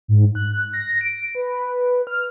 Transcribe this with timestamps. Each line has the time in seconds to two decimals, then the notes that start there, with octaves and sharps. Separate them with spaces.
0.08 G#2
0.35 F#6
0.73 A#6
1.01 D7
1.35 B4
2.07 F6